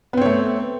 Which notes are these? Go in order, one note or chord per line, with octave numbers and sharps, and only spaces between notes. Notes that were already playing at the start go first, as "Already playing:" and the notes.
A3 B3 C4 C#5